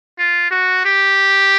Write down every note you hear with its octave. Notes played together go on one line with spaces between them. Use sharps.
F4
F#4
G4